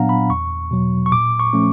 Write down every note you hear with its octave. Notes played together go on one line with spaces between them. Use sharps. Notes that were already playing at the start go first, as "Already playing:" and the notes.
Already playing: A#2 F#3 B3 D4 F5 F#5 A#5
B5
E2 C#6
B2 F#3
C#6
A#2 D6
C#6
F3 A3 C#4